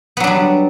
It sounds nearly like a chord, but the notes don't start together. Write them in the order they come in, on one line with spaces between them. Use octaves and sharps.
B3 F#3 D4 G3